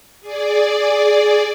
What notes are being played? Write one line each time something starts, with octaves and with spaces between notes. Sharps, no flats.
G#4 D5